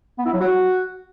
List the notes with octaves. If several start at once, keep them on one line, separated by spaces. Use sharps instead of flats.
B3
E4
F#3
F#4